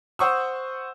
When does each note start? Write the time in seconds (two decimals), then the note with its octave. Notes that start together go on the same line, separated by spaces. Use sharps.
0.19 C5 F#5 C#6 D#6 E6